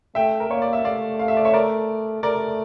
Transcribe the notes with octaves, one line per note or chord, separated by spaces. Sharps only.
A3 E5 G5
A#4
A#3 C#5
D5
E5
A3 D5 F5
F5
E5
D5
C#5 E5
A#4 D5
A3 A#4 D5